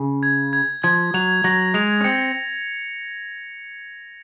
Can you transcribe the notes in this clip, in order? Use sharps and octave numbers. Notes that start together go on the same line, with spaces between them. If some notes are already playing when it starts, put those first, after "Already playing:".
Already playing: C#3
G#6
G#6
F3 G#6
F#3 F7
F#3 A#6
G#3 F7
C#4
C4 C#7